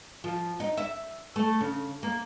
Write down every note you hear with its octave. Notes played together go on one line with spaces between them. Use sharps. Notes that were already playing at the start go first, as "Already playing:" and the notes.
F3
D#4
E5
A3
C#3
A#3